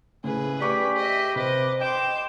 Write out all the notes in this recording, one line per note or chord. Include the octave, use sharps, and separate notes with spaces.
A2 C#3 G#4 B4
G4 D5 C#6 D6 B6
D#5 E5 B6
C3 B4 C5 D#5 D6
D#5 G5 C6 D6 E7